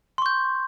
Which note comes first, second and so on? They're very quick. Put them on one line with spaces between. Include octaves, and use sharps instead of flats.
C6 C#6 G6